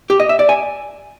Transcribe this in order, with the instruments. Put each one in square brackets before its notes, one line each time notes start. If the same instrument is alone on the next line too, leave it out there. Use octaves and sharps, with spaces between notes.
[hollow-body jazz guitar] G4
D#5
E5
D5
G#5